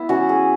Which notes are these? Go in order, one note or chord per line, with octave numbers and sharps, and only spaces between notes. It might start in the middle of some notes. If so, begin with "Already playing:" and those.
Already playing: B3 E4
E3 C#4 F#4
G#4